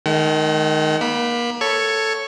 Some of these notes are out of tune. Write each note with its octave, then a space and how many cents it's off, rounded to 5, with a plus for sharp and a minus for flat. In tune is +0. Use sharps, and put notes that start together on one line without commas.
D#3 +0 G#3 +45 F#5 +45
A#3 +35 B5 +0
A4 +5 C#5 +0 C#6 +0